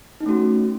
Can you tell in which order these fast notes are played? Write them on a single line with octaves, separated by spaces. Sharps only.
D#4 C#4 A3 F#4